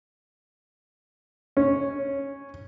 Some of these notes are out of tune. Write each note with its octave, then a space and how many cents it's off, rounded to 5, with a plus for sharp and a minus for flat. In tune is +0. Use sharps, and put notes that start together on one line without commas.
C#4 -5